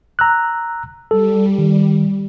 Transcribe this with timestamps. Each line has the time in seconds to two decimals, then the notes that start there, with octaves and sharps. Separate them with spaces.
0.19 A#5 E6 F#6
1.11 G3 A4
1.58 D#3